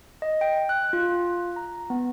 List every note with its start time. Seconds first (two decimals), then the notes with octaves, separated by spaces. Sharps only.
0.22 D#5
0.41 G5
0.69 F#6
0.93 F4
1.56 A#5
1.90 B3